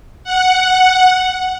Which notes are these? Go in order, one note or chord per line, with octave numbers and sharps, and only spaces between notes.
F#5